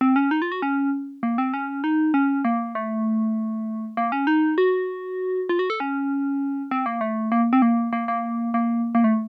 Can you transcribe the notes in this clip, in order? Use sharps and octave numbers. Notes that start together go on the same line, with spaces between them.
C4
C#4
D#4
F4
F#4
C#4
A#3
C4
C#4
D#4
C#4
A#3
A3
A#3
C#4
D#4
F#4
F4
F#4
A4
C#4
C4
A#3
A3
A#3
C4
A#3
A#3
A#3
A#3
A#3
A3